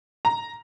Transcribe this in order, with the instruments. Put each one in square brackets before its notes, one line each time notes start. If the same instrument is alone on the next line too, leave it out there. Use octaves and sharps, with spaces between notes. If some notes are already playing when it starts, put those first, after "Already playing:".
[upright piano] A#5